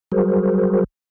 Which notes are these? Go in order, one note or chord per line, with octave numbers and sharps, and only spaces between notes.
F#3 G3 F#4 G#4 A#4 C5